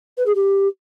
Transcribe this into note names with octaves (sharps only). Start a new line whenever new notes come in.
B4
G#4
G4